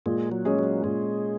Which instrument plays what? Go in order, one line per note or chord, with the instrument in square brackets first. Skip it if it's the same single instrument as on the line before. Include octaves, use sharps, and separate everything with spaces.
[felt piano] A#2 [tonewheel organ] G#3
[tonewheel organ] F#3
[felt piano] G#3 C#4 G#4 C#5
[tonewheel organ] F#3
[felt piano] A#2 [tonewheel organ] G#3